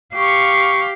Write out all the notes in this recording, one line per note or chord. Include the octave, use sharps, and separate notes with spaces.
G4 F5 C#6